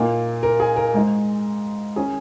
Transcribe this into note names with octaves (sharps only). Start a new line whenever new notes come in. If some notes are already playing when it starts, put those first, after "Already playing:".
Already playing: A#2 A#3 D#4
A#4
G#4
A#4
G#2 G#3 D#4
D#3 C#4 G#4